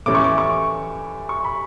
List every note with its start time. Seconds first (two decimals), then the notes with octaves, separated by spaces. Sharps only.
0.06 A2 E3 A3 C#4 D6
0.15 C#6
0.24 D6
0.38 C#6
1.29 C#6
1.44 B5